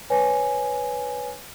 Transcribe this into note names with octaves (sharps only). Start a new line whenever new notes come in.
B4 C#5 G#5